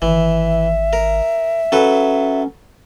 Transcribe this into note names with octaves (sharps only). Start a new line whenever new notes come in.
G#1 E3 E5
A#4
F#3 C#4 A4 B4